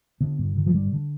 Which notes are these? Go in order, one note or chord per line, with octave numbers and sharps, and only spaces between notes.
D3 B3
G2
D3
F3
D3 G3
D3